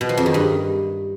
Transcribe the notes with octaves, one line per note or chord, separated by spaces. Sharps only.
B2
F3
F2
D#3
G2